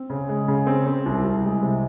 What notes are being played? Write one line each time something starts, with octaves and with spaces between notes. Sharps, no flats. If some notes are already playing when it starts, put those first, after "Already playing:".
Already playing: C4
C#3
G#3
C#3
C4
C4
C2
C2
G#3
C3